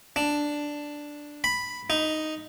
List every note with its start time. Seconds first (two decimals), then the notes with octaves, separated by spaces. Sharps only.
0.16 D4
1.44 B5
1.90 D#4